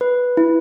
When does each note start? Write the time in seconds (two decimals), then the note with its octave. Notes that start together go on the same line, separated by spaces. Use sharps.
0.01 B4
0.37 E4